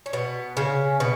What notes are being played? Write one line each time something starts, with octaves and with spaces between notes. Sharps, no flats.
C#4
B2 B3
C#3 C#4
B2 B3